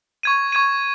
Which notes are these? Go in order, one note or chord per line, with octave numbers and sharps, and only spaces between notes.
C#6 G#6 D#7
C#6 G#6 D#7